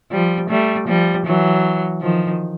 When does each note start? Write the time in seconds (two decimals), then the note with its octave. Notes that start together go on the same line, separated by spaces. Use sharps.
0.11 F3 G3
0.49 G3 A3
0.87 F3 G3
1.26 E3 F#3
2.01 D#3 F3